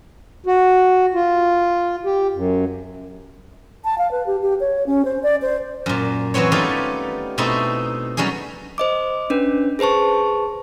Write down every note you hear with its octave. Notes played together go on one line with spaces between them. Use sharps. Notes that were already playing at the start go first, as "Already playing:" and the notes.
F#4
F4
G4
F#2
A5
F5
B4
G4
G4
C#5
C#4
C5
D5
C5
F#2 A#2
E3 F#3 B3 C4 C#5
G3 A3 B3 D#4 F4 G4
B2 A3 C4 D#4 E4
F#3 G3 C#4 D#4 G#4
C5 D#5 D6
C#4 D4 B4
G#4 B4 C5 A5 C#6